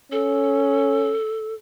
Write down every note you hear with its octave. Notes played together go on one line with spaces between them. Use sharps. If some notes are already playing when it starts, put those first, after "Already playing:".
C#4 A4